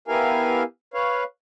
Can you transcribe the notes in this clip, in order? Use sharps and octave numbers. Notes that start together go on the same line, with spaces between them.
B3 E4 G4 A#4 F5 G#5
B4 C#5 F5